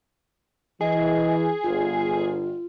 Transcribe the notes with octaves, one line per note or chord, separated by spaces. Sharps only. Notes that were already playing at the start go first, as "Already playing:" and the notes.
E3 G#4 D#5
G1 F4